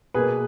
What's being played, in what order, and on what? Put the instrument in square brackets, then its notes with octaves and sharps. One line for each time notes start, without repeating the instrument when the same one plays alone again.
[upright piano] B2 A#3 G#4 B4